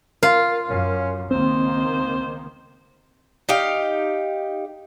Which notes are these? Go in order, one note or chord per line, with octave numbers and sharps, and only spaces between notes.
F4 A#4
F#2 C#4
C#2 D#3 A#3 C4 C5
D#4 G4 F5